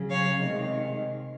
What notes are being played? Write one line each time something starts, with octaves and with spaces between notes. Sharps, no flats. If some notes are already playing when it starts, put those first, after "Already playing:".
Already playing: C#3 F#3
C#5 F5
C3 D#3 G#3